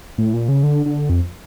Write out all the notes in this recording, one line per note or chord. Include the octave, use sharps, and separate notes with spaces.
A2
A#2
C#3
D3
D3
F2